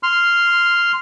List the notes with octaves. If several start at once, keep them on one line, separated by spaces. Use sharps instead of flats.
C6 F6